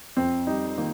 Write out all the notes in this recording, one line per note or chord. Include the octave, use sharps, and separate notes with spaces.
F2 C4
G3 D#4
D#3 A#3